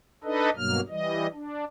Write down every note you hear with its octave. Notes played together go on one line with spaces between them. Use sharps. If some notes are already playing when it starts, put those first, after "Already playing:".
D4 D#4 A4 B4 D#5
G2 B2 F#3 A#3 F6
E3 G3 D#5
D4